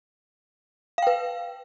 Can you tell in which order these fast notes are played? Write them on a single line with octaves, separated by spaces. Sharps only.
F5 G5 B4